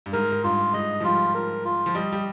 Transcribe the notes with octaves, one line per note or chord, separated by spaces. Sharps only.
G2
G#2 A#4
G#2
G2 F4
G#2 D#5
F3
G3 F4
A#4
F4
F3
G3 D#5
G3